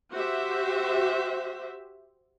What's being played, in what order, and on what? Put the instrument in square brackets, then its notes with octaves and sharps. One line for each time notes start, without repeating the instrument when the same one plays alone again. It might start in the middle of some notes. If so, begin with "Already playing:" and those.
[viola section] F#4 G4 C5 E5